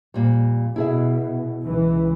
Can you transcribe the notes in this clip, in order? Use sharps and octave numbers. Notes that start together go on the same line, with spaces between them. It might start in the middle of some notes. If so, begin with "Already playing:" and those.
F2 A#2 G3
B2 E4 G#4 E5
C#2 E3